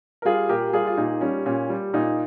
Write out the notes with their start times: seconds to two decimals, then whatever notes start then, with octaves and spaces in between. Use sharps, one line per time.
0.22 A#4
0.25 G3 F4 G#4
0.49 A#2 G4 A#4
0.73 G3 F4 G#4
0.87 F4
0.97 A#2 D#4
1.21 G3 C#4
1.46 A#2 C#4
1.69 G3
1.94 A#2 D#4